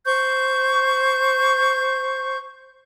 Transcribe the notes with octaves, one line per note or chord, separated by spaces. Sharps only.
C5 C#6 G6